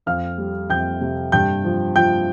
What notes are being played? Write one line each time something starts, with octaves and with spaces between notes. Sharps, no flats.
F2 F5 F6
G3
F2 G5 G6
C3
G2 G5 G6
F3
F3 G5 G6